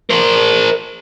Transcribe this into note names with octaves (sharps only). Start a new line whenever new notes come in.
A#4 C5